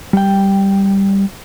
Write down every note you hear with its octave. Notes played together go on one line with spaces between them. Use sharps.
G3 G5